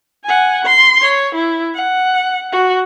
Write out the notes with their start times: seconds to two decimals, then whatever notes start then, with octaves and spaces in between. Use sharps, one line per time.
0.25 F#5 G#5
0.65 C6
1.02 C#5
1.35 E4
1.75 F#5
2.52 F#4